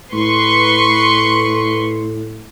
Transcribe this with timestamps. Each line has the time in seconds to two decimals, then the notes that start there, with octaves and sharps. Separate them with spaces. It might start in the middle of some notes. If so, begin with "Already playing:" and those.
0.13 A2 B4 C6 C#6